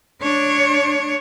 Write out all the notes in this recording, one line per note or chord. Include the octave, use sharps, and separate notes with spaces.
D4 C#5